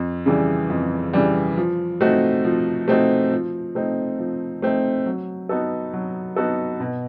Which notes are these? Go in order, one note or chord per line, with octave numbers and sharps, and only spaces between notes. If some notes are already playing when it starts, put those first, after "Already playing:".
Already playing: F2
C#3 E3 G3
F2
C#3 E3 G3
F3
A3 C4 D#4 F#4
F3
A3 C4 D#4 F#4
F3
A3 C4 D#4
F3
A3 C4 D#4
F#3
B3 D#4 F#4 A4
F#3
B3 D#4 F#4 A4
B2